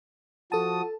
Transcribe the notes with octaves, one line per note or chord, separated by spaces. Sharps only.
F3 F#4 A4 A5 D#6